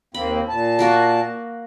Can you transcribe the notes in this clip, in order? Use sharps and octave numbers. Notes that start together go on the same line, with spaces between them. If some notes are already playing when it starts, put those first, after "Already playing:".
D#2 A#3 C4 B5
A#2 A5
A#3 F#4 A#4